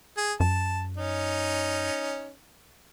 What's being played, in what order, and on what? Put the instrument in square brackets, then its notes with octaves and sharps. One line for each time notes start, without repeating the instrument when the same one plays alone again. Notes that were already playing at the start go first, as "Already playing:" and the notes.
[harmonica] G#4
[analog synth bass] F#2 [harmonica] A5
[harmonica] C#4 D#4